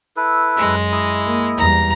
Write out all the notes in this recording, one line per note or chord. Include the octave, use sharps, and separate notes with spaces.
E4 A4 B4
F#2 G#3
E4 D#5
A#3
E2 G3 A#5